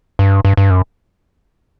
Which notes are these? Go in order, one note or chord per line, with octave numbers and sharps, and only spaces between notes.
G2
G2
G2
F#2